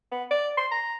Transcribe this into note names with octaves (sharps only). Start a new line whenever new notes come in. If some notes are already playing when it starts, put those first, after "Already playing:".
B3
D5
C6
A#5